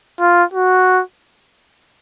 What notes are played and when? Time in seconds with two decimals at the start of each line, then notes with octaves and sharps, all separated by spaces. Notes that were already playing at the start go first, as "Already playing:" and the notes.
0.20 F4
0.54 F#4